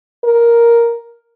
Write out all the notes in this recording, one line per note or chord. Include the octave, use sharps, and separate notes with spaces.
A#4